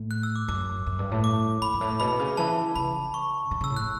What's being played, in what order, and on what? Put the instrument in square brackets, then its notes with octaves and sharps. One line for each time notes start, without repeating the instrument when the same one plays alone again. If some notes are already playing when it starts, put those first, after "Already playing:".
Already playing: [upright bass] A2
[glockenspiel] F#6
E6
D6
[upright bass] F#2 [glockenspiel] D6
[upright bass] F#2
G2
A2
[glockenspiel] D6
[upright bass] E2 [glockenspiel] B5
[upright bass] G2
A2
[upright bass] B2 [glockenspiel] B5
[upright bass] C#3
[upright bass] E3 [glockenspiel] A5
[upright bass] C#3 [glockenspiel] B5
[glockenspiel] C#6
[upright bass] D3
[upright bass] C#3 [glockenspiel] E6
[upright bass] A2
[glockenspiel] F#6